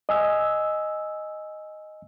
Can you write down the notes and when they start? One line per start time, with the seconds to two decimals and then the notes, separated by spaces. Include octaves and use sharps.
0.09 D#5 G#5 E6